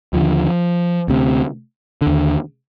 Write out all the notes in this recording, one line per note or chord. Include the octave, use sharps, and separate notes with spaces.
D#2 D3 F3
D2 C3
D3
D#2